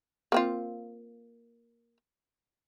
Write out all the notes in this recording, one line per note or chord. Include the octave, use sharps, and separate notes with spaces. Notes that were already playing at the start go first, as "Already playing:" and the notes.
A#3 C4 F4